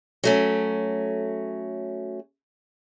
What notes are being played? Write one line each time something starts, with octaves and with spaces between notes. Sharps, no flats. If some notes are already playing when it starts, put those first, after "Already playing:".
F#3 A3 C#4